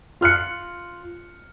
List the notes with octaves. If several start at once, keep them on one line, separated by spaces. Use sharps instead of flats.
F4 F6 F#6 C#7